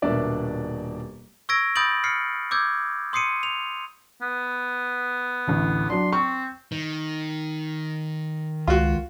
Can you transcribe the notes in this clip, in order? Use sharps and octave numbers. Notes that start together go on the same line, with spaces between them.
D#1 B2 D4 A#4 D5 E5
C#6 E6 G#6 A#6 D7
B5 D#6 G6 A6 D7 F#7
F6 C7 C#7
D6 E6 G6 G#6
C6 D#6 C7 C#7 D#7
F7
B3
A1 D2
F#3 D4 C6
C4 C#6
D#3
C#2 F4 F#4